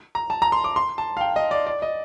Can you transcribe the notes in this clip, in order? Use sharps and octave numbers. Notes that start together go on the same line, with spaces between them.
A#5
A5
A#5
C6
D6
C6
A5
F5
G5
D#5
D5
D5
D#5